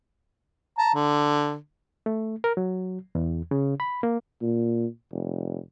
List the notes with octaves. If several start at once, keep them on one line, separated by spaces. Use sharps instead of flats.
A5 A#5
D3
A3
A#4
F#3
E2
C#3
B5
A#3
A#2
F1